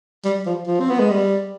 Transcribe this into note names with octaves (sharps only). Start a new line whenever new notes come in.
G3
F3
F3
C4
B3
G#3
G3